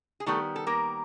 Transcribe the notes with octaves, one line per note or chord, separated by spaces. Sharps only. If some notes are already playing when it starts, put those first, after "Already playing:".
G#4
D#3 G3 A3 B3 A4
A4
A#3 A#4